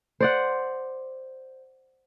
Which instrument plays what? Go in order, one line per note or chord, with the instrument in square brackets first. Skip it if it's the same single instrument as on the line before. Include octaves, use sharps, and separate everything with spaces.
[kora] C5 D5 F#5